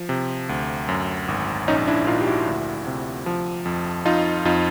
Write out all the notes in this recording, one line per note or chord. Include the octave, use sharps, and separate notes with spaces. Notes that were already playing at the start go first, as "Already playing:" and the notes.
Already playing: F3
C3
D2
F#2
G#1
A#1 C#4 D#4
D4 E4
A#2 D#4 F4
G4
E4 F#4
D2
C3
F3
F2
F2 D#4 F4
F2 D#4 F4